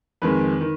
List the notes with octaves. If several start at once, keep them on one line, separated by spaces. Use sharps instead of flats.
F2 D#3 G#3 B4
D#3